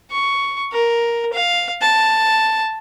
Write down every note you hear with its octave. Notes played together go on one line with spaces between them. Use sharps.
C#6
A#4
F5
A5